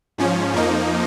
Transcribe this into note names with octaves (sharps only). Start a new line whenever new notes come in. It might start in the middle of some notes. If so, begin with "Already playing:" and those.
G#2 F3 C#4
F2 F3 A#3 D#4